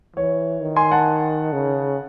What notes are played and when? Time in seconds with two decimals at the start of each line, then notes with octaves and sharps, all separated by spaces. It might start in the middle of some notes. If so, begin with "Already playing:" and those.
0.16 E3 C#5
0.61 D#3
0.76 G#5 C6
0.91 F#5 A5
1.53 C#3